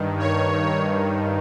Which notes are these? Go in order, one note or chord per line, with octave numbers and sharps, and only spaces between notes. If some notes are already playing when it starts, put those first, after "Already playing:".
Already playing: G2 D#3
C#5